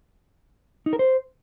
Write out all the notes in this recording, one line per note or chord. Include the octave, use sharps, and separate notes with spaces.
D#4
A#4
C5